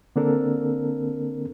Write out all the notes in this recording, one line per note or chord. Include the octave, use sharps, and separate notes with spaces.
D3 A#3 C4 D4 A4 A#4